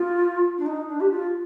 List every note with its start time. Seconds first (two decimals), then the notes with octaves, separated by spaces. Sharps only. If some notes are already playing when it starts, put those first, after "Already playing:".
Already playing: F4
0.57 D4
0.66 D#4
0.88 D4
1.00 G4
1.10 F4